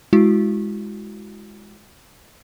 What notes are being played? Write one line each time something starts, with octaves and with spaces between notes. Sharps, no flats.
G#3 E4 F#4